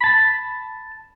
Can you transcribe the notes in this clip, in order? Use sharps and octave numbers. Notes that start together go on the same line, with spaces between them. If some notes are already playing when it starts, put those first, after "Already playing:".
A5 B5